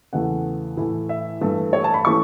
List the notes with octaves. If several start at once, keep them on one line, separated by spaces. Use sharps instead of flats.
E2 C#3 E3 A3 F#5
A2 E3 A3 E4
E5
G2 E3 A3
C#5
A5
B5
E3 A3 C#4 C#6